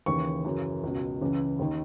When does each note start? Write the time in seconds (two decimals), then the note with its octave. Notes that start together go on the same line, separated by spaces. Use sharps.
0.06 D#2 C#3 E3 C#6
0.44 F#2 C#3 E3
0.84 C#2 B2
1.21 C#2 C#3 E3
1.59 D#2 D#3